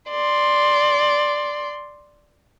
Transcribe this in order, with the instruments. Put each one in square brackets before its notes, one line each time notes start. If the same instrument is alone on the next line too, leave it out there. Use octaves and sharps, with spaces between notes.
[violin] D5 C6